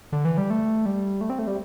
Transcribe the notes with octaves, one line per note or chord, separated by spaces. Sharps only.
D3
E3
G3
A3
G3
A3
C4
A3
G3